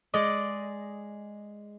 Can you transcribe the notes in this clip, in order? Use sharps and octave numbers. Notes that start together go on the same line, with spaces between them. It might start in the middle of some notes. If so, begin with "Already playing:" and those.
G#3 D5 D#5